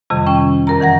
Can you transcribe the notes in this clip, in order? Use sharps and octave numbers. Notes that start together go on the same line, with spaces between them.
F2 C3 D#3 G3
C#4 G5
F#2 A#4 A#5
D#3 E3 F#5 A#6